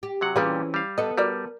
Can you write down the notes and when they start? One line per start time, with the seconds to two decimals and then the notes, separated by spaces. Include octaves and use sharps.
0.03 G4
0.21 C3 F#3 F#5
0.36 A#2 E3 G3 C4 C#4 F4 G#4 B4
0.74 G3 F5
0.98 B3 A4 D#5
1.18 G3 F#4 A#4 D5